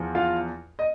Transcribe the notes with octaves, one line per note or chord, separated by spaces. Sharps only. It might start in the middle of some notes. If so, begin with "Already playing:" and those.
Already playing: E2 F3
F4 F5
D#5